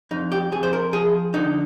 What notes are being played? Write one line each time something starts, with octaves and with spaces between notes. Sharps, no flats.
F2 D#4
G4
F2 G#4
C5
A#4
F3 G#4
D3 D#4